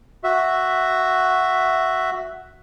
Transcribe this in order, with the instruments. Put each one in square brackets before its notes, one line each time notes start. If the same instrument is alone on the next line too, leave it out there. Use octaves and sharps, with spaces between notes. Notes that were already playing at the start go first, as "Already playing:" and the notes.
[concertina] F#4 E5